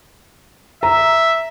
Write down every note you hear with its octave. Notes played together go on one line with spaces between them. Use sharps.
E5 A#5